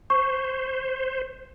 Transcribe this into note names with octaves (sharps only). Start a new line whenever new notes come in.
C5 C#6